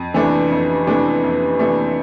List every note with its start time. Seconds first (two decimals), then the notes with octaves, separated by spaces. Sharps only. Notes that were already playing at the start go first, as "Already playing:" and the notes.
Already playing: F2
0.14 C3 E3 A3 D4
0.50 F2
0.87 C3 E3 A3 D4
1.23 F2
1.59 C3 E3 A3 D4